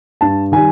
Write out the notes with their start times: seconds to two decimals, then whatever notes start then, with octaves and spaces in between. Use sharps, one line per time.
0.21 G2 A5
0.52 D#3 G3 G#5